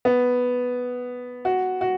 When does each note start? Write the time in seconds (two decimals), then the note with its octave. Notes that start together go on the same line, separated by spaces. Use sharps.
0.05 B3
1.45 F#4
1.81 F#4